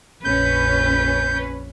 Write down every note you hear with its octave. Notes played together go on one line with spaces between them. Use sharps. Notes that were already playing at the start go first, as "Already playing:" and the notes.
A#1 F2 C#4 B4 G6